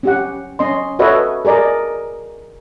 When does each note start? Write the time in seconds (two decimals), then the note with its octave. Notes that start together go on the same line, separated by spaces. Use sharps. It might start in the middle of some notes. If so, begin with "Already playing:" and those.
0.03 C#4 G4 F#5
0.59 C#4 D#5 C6
0.99 F#4 A4 B4 C#5 D#5 E5
1.45 G#4 A#4 D5 D#5